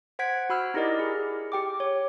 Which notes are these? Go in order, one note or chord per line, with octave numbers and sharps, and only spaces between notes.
C5 F#5 G#6 B6 D7
F#4 B5 E6 F6
D#4 E4 G4 A#4 D5 D#5
G#4
G4 G5 D6
C#5